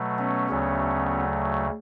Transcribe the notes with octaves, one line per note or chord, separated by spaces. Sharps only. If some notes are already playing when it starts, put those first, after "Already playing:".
Already playing: B2 F#3 A3
B3 C#4
D2 C#3 F#3 A3